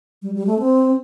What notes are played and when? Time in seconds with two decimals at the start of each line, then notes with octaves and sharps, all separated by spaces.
0.22 G3
0.35 G3
0.47 A3
0.59 C4